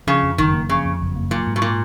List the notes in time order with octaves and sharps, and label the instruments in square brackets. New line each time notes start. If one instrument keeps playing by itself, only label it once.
[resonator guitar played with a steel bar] C#3 [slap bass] F3
[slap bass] F2
[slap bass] F#1 [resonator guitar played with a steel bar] D#3
[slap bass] A#3
[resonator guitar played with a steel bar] C#3 [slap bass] F3
[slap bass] F2
F#1
A#3
[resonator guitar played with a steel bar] A#2 [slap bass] F#3
[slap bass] G#2
[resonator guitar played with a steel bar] B2
A#2